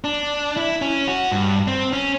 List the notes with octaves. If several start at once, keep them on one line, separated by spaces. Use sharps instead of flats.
D4
E4
C#4
F#4
G2
C4
C#4